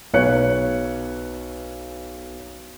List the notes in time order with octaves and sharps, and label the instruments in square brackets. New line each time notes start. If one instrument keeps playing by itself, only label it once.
[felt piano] B1 B4 C#5 F#6 C#7